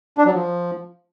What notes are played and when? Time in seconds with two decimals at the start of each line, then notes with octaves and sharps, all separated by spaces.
0.18 D4
0.26 F#3
0.34 F3